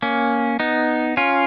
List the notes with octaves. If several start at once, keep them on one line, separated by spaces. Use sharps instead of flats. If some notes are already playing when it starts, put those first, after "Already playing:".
A#3 C#4
B3 D#4
C#4 F4